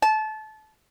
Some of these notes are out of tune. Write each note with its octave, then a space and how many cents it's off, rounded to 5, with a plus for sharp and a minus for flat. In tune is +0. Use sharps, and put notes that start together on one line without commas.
A5 -25